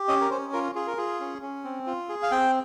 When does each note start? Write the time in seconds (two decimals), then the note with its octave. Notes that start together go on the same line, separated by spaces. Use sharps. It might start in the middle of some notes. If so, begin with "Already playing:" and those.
Already playing: G4
0.08 C#4 D#5
0.21 A#4
0.31 C#4 C5
0.53 F4 A#4
0.75 F4 G#4
0.87 A#4
0.97 F4 G#4
1.20 C#4
1.42 C#4
1.64 C4
1.86 F4
2.09 G#4
2.23 F5
2.31 C4 G5